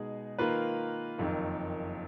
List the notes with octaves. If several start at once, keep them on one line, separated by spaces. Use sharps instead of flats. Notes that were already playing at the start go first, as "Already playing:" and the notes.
Already playing: B2 G#3 D#4 G#4
D#3 A#3 F4 B4
F#1 F2 D#3